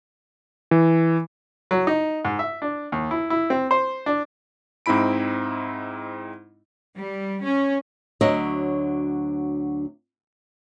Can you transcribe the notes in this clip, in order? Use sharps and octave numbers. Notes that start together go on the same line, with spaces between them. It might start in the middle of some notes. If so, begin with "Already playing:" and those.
E3
F#3
D#4
G#2
E5
D4
D#2
E4
E4
C4
C5
D4
G#2 C4 D#4 E4 B5 D7
G3
C#4
D2 F#3 D4 C#5 D#5 E5